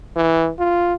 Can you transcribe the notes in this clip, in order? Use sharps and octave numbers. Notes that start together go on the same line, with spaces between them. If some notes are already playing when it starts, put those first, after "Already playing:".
E3
F4